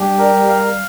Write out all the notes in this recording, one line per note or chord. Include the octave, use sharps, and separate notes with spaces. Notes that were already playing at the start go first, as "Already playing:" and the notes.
Already playing: G3 D4 G4
A#4
F5